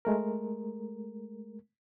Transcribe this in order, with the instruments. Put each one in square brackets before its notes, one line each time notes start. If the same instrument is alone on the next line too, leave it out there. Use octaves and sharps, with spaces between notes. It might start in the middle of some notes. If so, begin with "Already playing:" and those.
[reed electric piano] G#3 A3 A#4